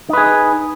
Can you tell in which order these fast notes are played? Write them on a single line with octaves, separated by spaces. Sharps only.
D#4 B4 G#4